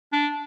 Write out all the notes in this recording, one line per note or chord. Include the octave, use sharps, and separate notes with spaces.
D4